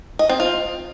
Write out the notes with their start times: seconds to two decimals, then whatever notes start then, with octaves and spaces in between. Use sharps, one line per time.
0.19 D#5
0.29 C4
0.40 F4